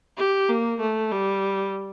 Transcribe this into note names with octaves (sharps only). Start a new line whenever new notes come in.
G4
A#3
A3
G3